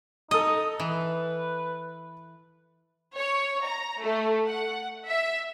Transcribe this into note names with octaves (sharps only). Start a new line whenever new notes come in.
D#4 A4 D#5 D#6
E3 B4
C#5
A#5
A3
F#5
E5